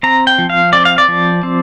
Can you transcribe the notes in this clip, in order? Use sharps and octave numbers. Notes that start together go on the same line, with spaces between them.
C4 A#5
G5
F3
F5
C4 D5
F5
D5
F3
C4